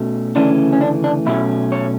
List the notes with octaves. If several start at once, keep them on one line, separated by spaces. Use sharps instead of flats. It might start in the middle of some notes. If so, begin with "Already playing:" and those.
Already playing: B2 A3 C#4
D2 C#3 E3 A3 C#4 D4
C#4
D4
D4
B1 B2 A3 C#4 E4
C#5